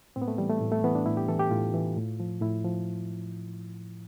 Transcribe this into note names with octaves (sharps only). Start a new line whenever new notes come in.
A2 C4
B3
A3
E3 G3
A3
A2
A3
E3 B3
D4
A2 E4
G4
E3 A4
G4
A2 F4
E3
A2
F3
A2 E4
F3